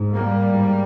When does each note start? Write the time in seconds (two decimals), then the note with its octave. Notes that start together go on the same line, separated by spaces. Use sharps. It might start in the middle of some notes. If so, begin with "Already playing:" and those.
Already playing: G#2
0.14 G3 A#3
0.46 G#2